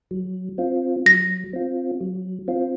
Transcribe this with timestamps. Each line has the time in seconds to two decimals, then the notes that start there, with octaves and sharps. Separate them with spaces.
0.11 F#3
0.58 C4 F4
1.06 F#3 A#6
1.53 C4 F4
2.01 F#3
2.48 C4 F4